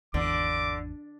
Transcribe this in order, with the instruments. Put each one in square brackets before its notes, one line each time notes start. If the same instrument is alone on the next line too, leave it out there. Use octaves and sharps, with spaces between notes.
[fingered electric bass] G#1 E2 E3 [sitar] D3 [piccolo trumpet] D6